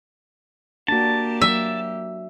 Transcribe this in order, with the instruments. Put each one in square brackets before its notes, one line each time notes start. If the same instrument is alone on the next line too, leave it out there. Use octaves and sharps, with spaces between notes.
[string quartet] A#3 G4 [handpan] D4 F#4 [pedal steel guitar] A5
[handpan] F#3 [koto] E5